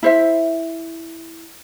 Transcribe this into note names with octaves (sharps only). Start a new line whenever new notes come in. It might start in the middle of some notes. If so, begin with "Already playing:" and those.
E4 C5 E5